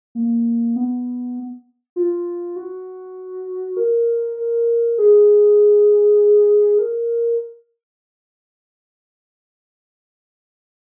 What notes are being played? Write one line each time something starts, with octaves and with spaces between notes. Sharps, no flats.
A#3
B3
F4
F#4
A#4
A#4
G#4
A#4